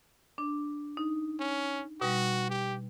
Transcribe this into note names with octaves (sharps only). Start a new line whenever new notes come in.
D4
D#4
C#4
B2 G3 F#4
G4